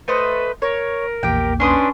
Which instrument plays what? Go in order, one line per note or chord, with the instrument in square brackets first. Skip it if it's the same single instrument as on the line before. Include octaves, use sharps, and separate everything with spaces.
[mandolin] A3 C5 D#5 [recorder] B4
[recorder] A#4 [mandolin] C#5
[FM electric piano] A#1 E2 A#3 [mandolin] G4 G5
[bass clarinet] C#4 [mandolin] D4 C6 D#6 [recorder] B4